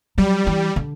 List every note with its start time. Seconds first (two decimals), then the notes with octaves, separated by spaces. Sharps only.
0.18 F#3 G3
0.47 E3
0.76 D3